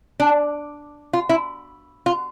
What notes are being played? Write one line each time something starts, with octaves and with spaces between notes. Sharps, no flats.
D4
F4
E4
F4